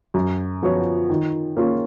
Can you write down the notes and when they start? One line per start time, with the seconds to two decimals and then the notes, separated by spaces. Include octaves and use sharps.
0.14 F#2
0.63 F3 B3 F#4 C#5
1.10 D#3
1.57 A#3 C#4 F4